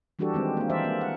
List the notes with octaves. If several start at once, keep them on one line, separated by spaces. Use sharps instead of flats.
E3 G3 D4 F#4 G4 A4
D#3 G#3 C4
A#3 D4
E3 C5 D5 E5
A#3
F#5